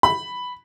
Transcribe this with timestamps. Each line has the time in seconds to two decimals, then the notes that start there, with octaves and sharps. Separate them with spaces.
0.03 B5